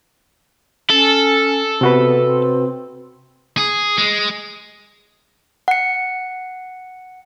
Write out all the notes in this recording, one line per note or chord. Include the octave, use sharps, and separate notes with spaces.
C#4 A4
C3 B3 F#4 B4
C4
G#4
G#3
F#5 C#7